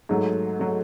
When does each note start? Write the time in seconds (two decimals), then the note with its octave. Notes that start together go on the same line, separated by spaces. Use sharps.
0.09 G#2 F#3 A3
0.59 F#3 A3